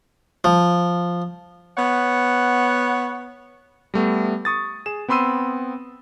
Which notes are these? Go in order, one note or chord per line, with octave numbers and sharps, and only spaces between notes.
F3
B3 C#5 F#5
G3 A3 B3
C#6 D#6 A6
G#4 E7
B3 C4 B5 C6 E6 D#7